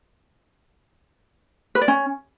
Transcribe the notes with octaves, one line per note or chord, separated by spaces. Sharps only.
B4
D5
C#4